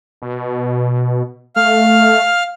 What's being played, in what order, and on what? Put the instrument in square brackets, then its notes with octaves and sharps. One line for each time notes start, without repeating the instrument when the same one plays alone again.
[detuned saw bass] B2
[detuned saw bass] A3 [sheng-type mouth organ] F5 F6